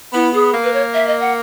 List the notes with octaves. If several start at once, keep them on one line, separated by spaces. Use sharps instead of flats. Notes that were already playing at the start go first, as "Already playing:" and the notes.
B3 E4
G#4
A#3
B4
C#5
E5
D#5
F#5